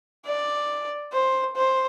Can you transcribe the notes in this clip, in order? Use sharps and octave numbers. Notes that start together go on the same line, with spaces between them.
D5
C5
C5